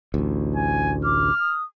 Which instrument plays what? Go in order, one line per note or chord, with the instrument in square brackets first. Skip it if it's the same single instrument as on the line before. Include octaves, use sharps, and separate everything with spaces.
[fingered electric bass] A1 D2
[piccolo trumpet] G#5
[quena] D6 [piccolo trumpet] F6
[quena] D#6